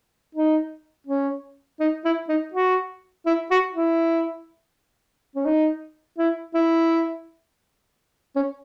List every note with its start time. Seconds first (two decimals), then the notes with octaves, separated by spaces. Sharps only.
0.35 D#4
1.07 C#4
1.80 D#4
2.05 E4
2.28 D#4
2.53 F#4
3.26 E4
3.51 F#4
3.74 E4
5.35 C#4
5.45 D#4
6.18 E4
6.54 E4
8.36 C#4